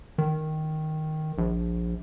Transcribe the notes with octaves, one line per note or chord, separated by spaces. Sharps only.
D#3
A#1